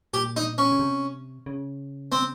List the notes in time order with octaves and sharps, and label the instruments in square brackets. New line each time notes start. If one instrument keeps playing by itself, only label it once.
[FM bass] A#2 [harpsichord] G4
[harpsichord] D#4
C#4
[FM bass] C#3
C3
C#3
[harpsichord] C4